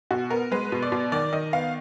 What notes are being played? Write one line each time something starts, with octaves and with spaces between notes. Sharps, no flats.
B2 F#4
B3 A#4
G#3 B4
B2
D5
B2
D#3 D5
D#3 D#5
B3 F5